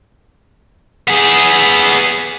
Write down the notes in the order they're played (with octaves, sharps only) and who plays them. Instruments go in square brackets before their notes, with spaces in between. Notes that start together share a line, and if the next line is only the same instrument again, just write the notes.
[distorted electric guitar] B3 G#4